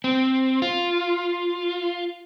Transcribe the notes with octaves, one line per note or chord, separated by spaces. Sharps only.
C4
F4